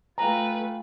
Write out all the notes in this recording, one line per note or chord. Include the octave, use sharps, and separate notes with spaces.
A3 F4 B4 F5 G5 G#5 A#5